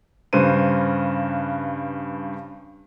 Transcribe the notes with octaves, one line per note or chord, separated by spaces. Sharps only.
G2 C#3 B4 C5 D#7